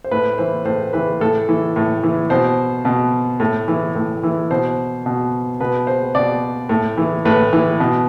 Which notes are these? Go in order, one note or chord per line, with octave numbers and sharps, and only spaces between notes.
C5
A2 B4
E3 C5
A2 C5
E3 B4
A2 A4
E3
A2
E3
B2 C5
B2
A2
E3
A2
E3
B2 C5
B2
B2 B4
C5
B2 D5
A2
E3
A2 B4
E3
B2